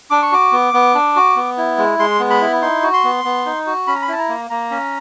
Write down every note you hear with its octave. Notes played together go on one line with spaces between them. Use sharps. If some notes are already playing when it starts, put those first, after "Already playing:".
D4 D6
C#6
F#4 D6
B3
B3
D4
F#4
B3
E4
G#3
G#3 C6
B3
B5
E4
D#4 C6
F#4
C6
B3
B3
D#4
F#4
C#4 B5
A#5
B5
E4 A5
A#5
A#3
A#3 A#5
C#4